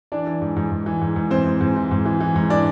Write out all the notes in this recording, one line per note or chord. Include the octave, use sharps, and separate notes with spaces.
E3 D4 D5
E3
G#2
G#2
G#2
E3
G#2
G#2
E3 C4 C5
G#2
G#2
E3
G#2
E3
E3
G#2
E3 D4 D5